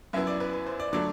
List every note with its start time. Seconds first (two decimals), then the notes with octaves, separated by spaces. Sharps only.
0.13 F#2 F#3 B3 E4 E5
0.27 D5
0.40 B4
0.53 B4
0.67 C5
0.80 D5
0.93 D3 F#3 A3 D5